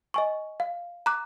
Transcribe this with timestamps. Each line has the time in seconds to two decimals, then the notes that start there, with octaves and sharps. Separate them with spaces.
0.14 D#5 G#5 C#6
0.60 F5
1.06 A#5 D6 F#6